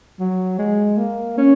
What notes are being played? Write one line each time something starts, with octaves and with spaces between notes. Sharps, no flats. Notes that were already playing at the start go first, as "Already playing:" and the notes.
F#3
G#3
A#3
C#4